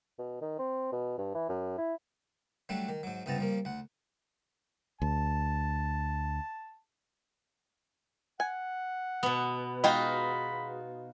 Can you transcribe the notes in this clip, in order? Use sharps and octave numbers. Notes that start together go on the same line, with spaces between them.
B2
D#3
C4
B2
G2
E3
F#2
E4
F#3 G3 A3 D4 F#5
D#3
G#2 F#3
C#2 G2 C3 B3 A5 A#5
G2 F3 A#3
D2 F#5
D2 A5
F#5 G#5
B2 B3
G#3 D#4 F4 F#4 D#5 G5 B5